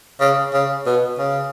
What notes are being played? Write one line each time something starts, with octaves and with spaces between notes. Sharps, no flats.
C#3
C#3
B2
C#3